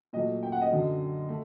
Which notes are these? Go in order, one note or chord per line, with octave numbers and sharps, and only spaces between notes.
A#2 F#3 A3 D#5
G5
F#5
D#5
F#2 D3 F#3
A3